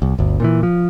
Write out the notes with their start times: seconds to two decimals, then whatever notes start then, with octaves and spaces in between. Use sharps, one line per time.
0.02 C2
0.19 G1 D2
0.40 A#2 D3 E3
0.63 F3